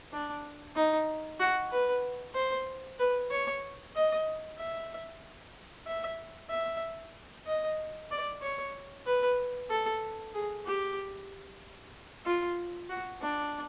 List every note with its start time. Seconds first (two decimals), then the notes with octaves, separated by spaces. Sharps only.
0.12 D4
0.76 D#4
1.40 F#4
1.71 B4
2.35 C5
2.99 B4
3.31 C#5
3.96 D#5
4.59 E5
5.87 E5
6.50 E5
7.46 D#5
8.11 D5
8.42 C#5
9.06 B4
9.70 A4
10.34 G#4
10.66 G4
12.26 F4
12.89 F#4
13.21 D4